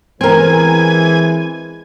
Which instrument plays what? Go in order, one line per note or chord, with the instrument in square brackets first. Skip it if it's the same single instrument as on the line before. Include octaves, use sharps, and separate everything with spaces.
[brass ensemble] E3 G#3 B4 [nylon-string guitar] C4 A#4 [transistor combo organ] G#5